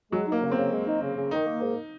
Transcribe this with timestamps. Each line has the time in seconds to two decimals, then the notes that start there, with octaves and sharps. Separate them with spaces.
0.12 F#3 G#3
0.27 A#3 D#4
0.43 C#3
0.51 C4
0.57 C#3
0.72 G#3
0.87 D#4
1.02 C#3
1.16 C#3
1.31 D#3 D#4
1.47 A#3
1.61 G#2